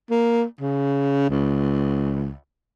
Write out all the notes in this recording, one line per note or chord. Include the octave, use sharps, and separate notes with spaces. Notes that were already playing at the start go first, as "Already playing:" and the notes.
A#3
C#3
C#2